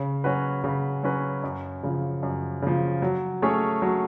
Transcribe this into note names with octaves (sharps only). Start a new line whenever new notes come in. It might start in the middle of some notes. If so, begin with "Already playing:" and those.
Already playing: C#3
F#3 C#4 F#4 B4
C#3
F#3 C#4 F#4 B4
F#2
C#3 F3
F#2
C#3 F3
F#3
A3 C#4 G#4 C#5
F#3